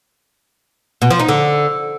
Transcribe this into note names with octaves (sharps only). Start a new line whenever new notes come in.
B2
F3
D#4
D3